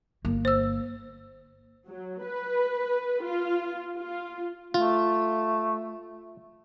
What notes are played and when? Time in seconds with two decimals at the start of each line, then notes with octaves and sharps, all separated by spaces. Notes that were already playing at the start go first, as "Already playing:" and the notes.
0.25 G1 A#3
0.45 C5 E6
1.88 F#3
2.24 B4
3.22 F4
3.98 F4
4.74 A3 F4